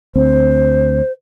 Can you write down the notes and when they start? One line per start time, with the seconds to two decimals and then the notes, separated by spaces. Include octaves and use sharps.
0.16 D2 C4 C5